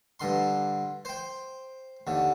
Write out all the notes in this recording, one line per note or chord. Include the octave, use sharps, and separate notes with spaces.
G2 D3 C6
C5 G5
D#2 D3